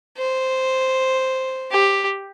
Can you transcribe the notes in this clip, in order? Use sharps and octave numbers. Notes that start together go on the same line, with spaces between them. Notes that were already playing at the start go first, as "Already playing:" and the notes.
C5
G4